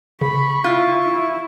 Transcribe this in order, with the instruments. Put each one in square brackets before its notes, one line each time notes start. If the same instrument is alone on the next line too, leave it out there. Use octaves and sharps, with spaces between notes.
[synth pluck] C#3 [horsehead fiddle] B5 [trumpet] C#6
[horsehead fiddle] E4 [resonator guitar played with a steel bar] F4 [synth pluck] F6
[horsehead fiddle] E4